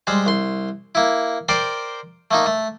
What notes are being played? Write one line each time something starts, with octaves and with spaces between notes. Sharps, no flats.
G3 G#3 C5
C2 C6
A#3 E4
A#4 C5 D5 G5 C6
A3 A#3 D#4
A3